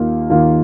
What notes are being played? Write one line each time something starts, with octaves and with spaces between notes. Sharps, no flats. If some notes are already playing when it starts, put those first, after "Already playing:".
Already playing: D#2 D#3 A#3 F4
D#2 D#3 A#3 F4